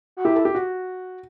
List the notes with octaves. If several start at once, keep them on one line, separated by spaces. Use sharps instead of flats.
F#4
E4 G4
A4
G4
F#4